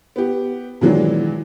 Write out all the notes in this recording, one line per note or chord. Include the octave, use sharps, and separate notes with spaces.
B3 G4
A#2 D#3 E3 F#3 G#3 D4